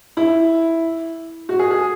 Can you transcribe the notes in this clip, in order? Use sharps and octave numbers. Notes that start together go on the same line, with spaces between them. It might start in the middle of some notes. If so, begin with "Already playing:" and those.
E4
F#4
G#4
G#4